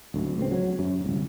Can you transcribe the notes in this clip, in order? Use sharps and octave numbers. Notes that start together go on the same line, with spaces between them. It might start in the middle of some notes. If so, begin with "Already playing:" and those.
D1 D2
C#2 C4
F#3
F#2
D1 C2